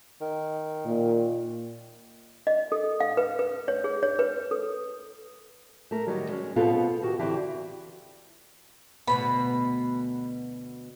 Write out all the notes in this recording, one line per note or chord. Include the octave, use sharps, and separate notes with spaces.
D#3
A#2
D#5
A4
F5
B4
B4
C#5
G#4
C#5
B4
A4
A3 A#4
D#3 F#3 G3
G#3 C#4
B2 B3 C4 F4 G#4 A4
D#3 F#4 G4
D3 E3 C4 E4 F#4 G4
D2 B2 B3 B5